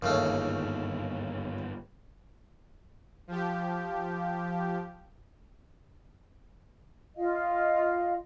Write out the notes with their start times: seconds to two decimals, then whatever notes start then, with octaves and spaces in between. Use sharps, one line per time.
0.02 G1 D#2 G#2 C#3 A3
3.27 F3 G4
7.17 F4 D#5 F5